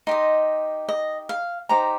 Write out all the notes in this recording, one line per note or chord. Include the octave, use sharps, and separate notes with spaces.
D#4 G4 D#5 C6
D#5
F5
D#4 G4 C5 A#5